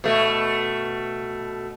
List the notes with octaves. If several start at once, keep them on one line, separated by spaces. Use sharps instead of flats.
B2 A3